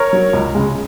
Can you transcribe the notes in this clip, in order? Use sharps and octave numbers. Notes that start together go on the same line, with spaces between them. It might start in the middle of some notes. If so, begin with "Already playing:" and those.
Already playing: A#4 C#5
F#3
C#2
C#3 G#3